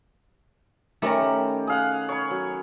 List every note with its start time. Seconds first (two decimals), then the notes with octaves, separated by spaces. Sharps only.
1.02 D#3 A3 C#4 G4 A#4 B5
1.67 G#4 F5 F#5
2.09 C#5 B5
2.31 F#3